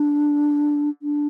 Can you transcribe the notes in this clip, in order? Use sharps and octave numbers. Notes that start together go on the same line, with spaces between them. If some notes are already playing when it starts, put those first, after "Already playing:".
Already playing: D4
D4